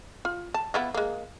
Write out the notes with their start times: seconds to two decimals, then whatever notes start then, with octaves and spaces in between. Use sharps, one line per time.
0.25 F4
0.54 A5
0.74 B3 E4 F4
0.94 G#3 A#3